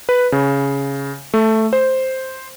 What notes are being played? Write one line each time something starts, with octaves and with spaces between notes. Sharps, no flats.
B4
C#3
A3
C5